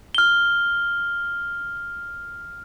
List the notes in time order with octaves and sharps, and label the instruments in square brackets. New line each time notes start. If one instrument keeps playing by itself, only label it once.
[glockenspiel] F6 G7